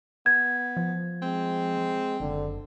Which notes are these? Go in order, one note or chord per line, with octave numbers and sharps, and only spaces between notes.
B3 G#6
F3
G#3 C4
F#1 D3